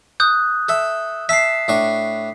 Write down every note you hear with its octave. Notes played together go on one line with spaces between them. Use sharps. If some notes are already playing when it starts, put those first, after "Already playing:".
D#6 F#6 G6
A4 E5
E5 A5 B6 C7
A2 D4 C#6